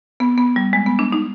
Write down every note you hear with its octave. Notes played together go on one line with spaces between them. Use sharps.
B3
B3
G3
G#3
B3
D4
D#4